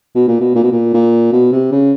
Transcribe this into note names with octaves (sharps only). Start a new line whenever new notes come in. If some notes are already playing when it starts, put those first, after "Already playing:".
B2
A#2
B2
A#2
B2
A#2
A#2
B2
C3
C#3